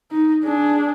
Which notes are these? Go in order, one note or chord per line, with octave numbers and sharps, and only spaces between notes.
D#4
D4 G#4